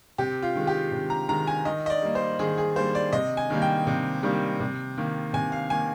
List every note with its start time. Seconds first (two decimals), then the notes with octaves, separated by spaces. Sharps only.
0.18 C3 G4
0.42 F4
0.55 D#3 G#3
0.67 G4
0.92 C3
1.10 A#5
1.29 D#3 G#3 A#5
1.47 G#5
1.65 D#3 D#5
1.86 D#5
1.90 D5
2.02 G3 A#3
2.15 C5
2.39 D#3 G#4
2.58 G#4
2.76 G3 A#3 C5
2.95 D5
3.13 C3 D#5
3.37 G#5
3.50 D#3 G3 A#3
3.62 G5
3.87 C3
4.23 D#3 G3 A#3
4.60 C3
4.98 D#3 A#3
5.33 C3 G#5
5.52 F5
5.70 D#3 A#3 G#5